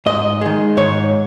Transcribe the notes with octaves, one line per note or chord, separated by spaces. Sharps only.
G#2 D#5
D#3 G#3
G#2 C#5